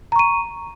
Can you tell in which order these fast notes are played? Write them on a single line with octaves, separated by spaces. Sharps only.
A#5 C#6 D#7